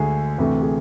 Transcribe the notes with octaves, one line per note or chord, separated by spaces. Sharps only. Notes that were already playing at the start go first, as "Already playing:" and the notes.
Already playing: D2 D3 G#3 G#4
D2 C3 E3 A3
G#4